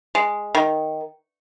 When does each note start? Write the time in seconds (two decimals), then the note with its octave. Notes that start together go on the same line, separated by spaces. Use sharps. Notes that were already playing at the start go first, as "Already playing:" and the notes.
0.15 G#3
0.55 D#3